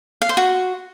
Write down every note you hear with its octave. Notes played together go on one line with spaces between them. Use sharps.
F5
C5
F#4